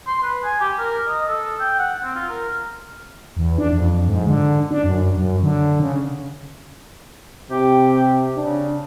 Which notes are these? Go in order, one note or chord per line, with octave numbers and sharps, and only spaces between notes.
C6
B4
G#5
G4
A#4
D#5
A4
G5
F#5
C4
F4
A#4
E2
D4
F2
G#2
D3
D4
F#2
F#2
D3
C#3
C3 G4
C#3 D4